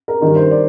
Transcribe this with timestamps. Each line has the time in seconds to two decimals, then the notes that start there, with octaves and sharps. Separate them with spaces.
0.08 A#4
0.22 G2 D#3 A#4
0.36 C5
0.51 D5